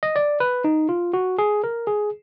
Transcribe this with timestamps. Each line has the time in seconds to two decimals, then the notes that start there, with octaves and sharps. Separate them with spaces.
0.03 D#5
0.16 D5
0.40 B4
0.64 D#4
0.89 F4
1.13 F#4
1.38 G#4
1.64 A#4
1.87 G#4